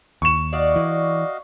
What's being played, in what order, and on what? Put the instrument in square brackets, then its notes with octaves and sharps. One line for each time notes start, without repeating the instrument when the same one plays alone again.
[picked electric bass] D#2 [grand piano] C#6 E7
[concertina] F#4 D#5 F5 [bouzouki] D5
[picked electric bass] E3